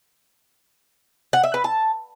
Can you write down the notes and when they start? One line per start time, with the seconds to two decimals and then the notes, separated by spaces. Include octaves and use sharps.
1.33 F#5
1.44 E5
1.54 B4
1.64 A5